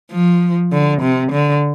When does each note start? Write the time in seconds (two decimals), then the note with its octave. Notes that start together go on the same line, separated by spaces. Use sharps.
0.11 F3
0.72 D3
1.02 C3
1.32 D3